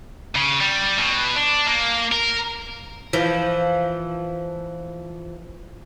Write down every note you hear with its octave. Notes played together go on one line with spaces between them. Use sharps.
C#3
G3
B2
D4
A#3
A#4
E3 F3